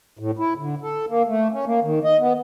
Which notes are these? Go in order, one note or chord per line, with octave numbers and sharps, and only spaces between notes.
A2
E4
D3
A4
A#3
A3
C#4
A#3
D#3
D#5
B3